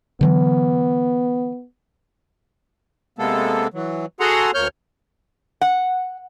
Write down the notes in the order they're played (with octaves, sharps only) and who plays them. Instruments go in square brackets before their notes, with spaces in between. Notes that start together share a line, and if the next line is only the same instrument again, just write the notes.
[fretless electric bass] D3 E3 F#3 [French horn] B3
[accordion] C3 G#3 A#3 B3 A4
E3 F#3
F#4 G#4 A4 F#5 A#5 C6
D2 A#3 C#5 F6 G6
[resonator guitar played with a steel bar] F#5